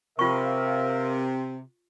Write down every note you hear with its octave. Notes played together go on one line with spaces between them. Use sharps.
C3 F4 A#4 C5 E5 F5 C#6